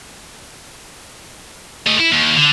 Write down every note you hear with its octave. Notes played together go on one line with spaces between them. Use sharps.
A3 D#5
E4
D#2
D3